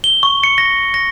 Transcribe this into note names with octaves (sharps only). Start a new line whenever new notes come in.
G7
C#6
C#7
A#6
A#6